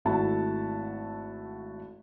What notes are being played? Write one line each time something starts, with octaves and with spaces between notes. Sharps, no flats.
G#1 A3 E4 F#4 A5